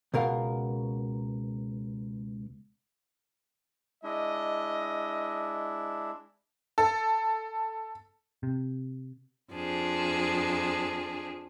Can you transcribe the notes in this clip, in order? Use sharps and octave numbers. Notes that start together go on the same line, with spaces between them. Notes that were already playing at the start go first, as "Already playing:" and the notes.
C#2 B2 A#4 F5 F#5
G#3 D4 E4 D#5
A4
C3
F2 F3 D4 G#4